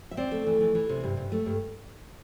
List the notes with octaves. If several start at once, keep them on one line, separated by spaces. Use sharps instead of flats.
E5
C4 D5
A3
E3
E3
E3
C3
G2
G2
A3
G2